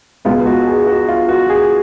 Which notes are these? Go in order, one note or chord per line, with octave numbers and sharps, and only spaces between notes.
C#2 B2 G#3 B3 F4
F#4
G#4
F#4
F4
F#4
G#4